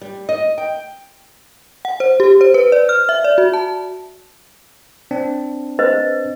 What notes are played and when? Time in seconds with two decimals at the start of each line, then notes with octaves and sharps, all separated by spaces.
0.01 G3
0.29 D#5
0.58 G5
1.85 F#5
2.00 C5
2.20 G4
2.41 C5
2.54 B4
2.72 D5
2.89 F6
3.09 E5
3.24 D5
3.38 F#4
3.54 A5
5.11 C4 D4
5.79 B4 C5 D#5